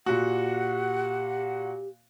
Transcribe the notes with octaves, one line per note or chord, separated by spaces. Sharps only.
A#2 F#4 G4 F#5